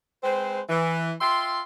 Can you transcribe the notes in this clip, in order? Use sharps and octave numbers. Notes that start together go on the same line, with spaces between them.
G#3 C4 B4 C5
E3
F4 E5 G5 C6